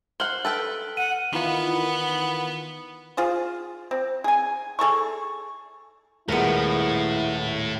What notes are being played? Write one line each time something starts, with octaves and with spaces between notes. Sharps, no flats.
C5 F#5 F6 F#7 G7
A4 B4 G5
F#5 D#7
D#3 E3 B3 F4
F4 G#4 C5
C4
G#4 G#5
G#4 A4 A5 C#6
D#1 A2 G#3 B3 E4 A#4